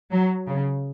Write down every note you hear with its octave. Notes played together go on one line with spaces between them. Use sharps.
F#3
C#3